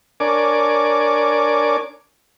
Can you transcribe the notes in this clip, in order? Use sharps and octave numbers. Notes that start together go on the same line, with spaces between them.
D4 A#4 C#5 D5 G#5 D6